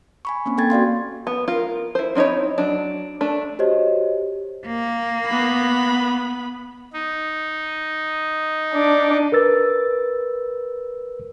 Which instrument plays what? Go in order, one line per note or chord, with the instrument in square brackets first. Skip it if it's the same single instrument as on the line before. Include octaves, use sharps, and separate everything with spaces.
[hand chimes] G#5 B5 C#6
A#3 C4 C#4
A#3 A4 G5 G#6 A6
F#4 D5 F5 C6
[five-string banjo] B3
F4 A#4
E4 C5
C4 C#4 D#4 E4 C#5
F#3 D4
A3 D4
[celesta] F#4 G4 C5 C#5 D#5
[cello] A#3
[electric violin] B3 B5
[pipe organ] D#4
[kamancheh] D4 D6
[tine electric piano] A#4 B4 E6 A6